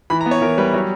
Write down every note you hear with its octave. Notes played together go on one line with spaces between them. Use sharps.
E3 B5
A#5
B3
C#5
E3 A#4
G3 B4
F#3 C#5